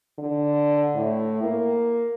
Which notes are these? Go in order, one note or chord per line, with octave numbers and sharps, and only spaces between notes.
D3
A2
A#3